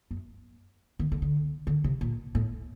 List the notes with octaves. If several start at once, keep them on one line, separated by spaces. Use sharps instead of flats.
F#2
D#3
D3
D3
D3
C3
A#2
A2